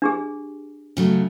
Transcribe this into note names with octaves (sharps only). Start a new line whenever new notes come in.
D4 G4 G#4
C#3 F#3 A3